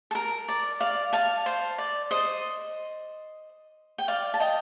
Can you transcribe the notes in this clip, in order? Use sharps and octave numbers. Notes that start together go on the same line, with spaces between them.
A4
A#4
D5
D5 F5
F5 A5
C5
D5
C5 D#5
G5
D5 F5
A5
D#5 G5